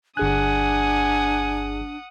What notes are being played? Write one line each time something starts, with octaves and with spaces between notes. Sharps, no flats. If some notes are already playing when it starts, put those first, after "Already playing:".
G1 D4 G#4 F#5 G#5 D#6 F#6